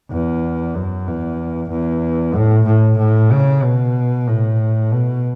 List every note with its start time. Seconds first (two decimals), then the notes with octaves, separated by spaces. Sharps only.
0.11 E2
0.75 F#2
1.07 E2
1.71 E2
2.35 A2
2.67 A2
2.98 A2
3.31 C#3
3.63 B2
4.27 A2
4.92 B2